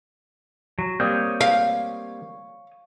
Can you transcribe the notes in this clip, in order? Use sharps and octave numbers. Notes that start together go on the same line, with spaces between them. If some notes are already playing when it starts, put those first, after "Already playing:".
F#3
G3 A#3 C4 C#5 D#6 G6
F5